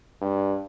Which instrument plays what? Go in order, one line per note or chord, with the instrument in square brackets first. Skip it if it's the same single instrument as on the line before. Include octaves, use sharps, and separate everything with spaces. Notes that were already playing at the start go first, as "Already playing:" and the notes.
[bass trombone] G2